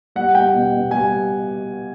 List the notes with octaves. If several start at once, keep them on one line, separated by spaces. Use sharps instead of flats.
G3 F#5
G3 G5
B2
B2
G3 G#5